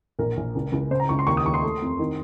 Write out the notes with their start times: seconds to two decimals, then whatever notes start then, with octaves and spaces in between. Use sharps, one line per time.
0.19 A#1 A#4
0.37 A#1
0.55 C#2
0.72 C#2
0.91 C#3 C5
1.00 A#5
1.09 C#2 C#6
1.19 C6
1.27 D#2 C#6
1.37 D#6
1.45 D#2 C#6
1.54 C6
1.63 A3
1.82 F2
1.99 D#3